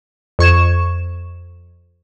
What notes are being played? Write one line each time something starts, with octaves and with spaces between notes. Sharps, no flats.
F2 C#6 G#6 E7